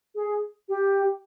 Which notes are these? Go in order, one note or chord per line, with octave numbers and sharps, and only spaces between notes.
G#4
G4